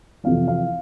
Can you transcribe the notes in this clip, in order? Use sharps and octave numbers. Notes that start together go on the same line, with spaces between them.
F2 C3 E3 F5
F5